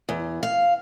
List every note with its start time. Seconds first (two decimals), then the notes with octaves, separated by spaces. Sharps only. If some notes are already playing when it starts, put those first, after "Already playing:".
0.09 E2
0.43 F5